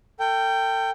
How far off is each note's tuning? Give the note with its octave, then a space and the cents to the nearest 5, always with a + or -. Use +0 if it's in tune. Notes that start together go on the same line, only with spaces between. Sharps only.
A4 +40 G5 +0